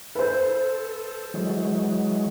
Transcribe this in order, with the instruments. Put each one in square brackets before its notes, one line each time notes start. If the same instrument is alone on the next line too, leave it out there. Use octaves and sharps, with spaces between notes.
[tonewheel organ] A4 [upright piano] B4 C5
[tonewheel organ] E3 F#3 G#3